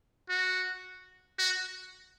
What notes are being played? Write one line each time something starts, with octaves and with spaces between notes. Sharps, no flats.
F#4
F#4